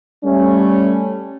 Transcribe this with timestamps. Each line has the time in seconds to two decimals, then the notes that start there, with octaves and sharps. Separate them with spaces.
0.24 G3 A3 C#4